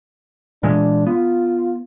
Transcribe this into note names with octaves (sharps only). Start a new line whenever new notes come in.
A#2 E3 G#3 D4
B3 F4